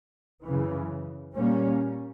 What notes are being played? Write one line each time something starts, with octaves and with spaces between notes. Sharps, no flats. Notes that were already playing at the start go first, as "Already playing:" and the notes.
F#2 C#3 E3
A#2 G3 A#3 C#4